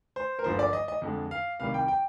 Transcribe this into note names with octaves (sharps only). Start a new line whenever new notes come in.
C5
A#4
G1 G2 D3 F3 A#3 C5
D5
D#5
D#5
F2 D3 G#3
F5
C2 C3 D#3 G3 F5
G5
G5